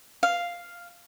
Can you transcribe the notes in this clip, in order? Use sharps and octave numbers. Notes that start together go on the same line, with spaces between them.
F5